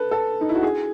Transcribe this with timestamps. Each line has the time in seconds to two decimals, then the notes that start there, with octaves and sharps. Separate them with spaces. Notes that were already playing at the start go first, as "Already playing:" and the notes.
Already playing: A4 B4
0.11 A4
0.41 D#4
0.49 E4
0.55 F#4
0.63 G#4